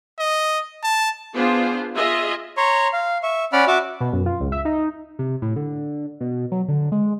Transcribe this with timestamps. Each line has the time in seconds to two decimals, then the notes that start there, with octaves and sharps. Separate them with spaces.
0.19 D#5
0.83 A5
1.33 B3 D4 F4 G#4 C5
1.95 F4 G#4 D#5 E5
2.57 C#5 A#5 C6 C#6
2.93 F5
3.23 E5 C#6
3.53 C#4 D5 F#5 B5 F6
3.67 F#4 E5 F#5 D6
4.00 B2
4.13 F#2
4.26 F4
4.40 C#2
4.52 E5
4.65 D#4
5.19 C3
5.42 A2
5.56 D3
6.20 B2
6.52 F#3
6.68 D3
6.92 G#3